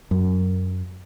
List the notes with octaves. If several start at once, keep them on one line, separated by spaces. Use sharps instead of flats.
F#2